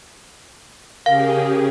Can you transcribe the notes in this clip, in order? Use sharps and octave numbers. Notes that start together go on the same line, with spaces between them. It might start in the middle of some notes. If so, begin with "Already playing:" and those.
C#3 G4 G#4 A#4 F5